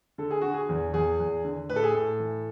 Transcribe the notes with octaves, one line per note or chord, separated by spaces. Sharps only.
D3 A4
G#4
D3 F#4
G#4
E2
E2 G#4
E2
D3
A2 B4
A4
G#4
A2 A4
E3